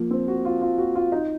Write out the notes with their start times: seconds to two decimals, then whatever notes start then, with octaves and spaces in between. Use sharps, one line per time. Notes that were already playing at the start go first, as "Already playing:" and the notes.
Already playing: F3 A#3
0.11 C4
0.28 F#4
0.45 F4
0.61 F4
0.78 F#4
0.95 F4
1.12 D#4